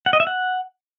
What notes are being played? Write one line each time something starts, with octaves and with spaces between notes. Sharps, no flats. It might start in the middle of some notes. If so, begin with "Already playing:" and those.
F#5
D#5
E5
F#5